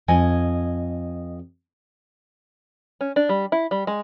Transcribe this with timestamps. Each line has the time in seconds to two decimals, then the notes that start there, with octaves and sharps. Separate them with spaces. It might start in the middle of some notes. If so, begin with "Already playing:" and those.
0.08 F2 D#5 G#5
3.01 C#4
3.16 D4
3.29 G3
3.52 E4
3.71 G3
3.87 G#3